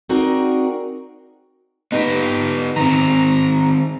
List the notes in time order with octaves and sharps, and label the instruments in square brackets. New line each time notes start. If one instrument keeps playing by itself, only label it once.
[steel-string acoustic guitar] C4 D#4 F#4 G#4 A#4 D5
[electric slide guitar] B3 G4 B4 [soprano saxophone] D#4
[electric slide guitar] D#3 C4 [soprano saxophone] A#5